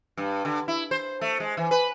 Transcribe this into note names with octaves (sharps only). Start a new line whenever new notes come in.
G2
D3
E4
C5
A3
G#3
E3
B4